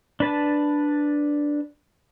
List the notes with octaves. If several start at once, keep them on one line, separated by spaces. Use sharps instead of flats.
D4 B4 A5